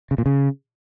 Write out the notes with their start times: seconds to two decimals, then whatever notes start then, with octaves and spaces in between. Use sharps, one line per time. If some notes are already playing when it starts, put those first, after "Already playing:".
0.11 C#3
0.18 A#2
0.26 C#3